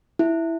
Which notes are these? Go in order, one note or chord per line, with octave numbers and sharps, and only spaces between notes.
E4